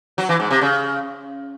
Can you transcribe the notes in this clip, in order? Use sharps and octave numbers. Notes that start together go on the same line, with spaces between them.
F#3
E3
G#2
C3
C#3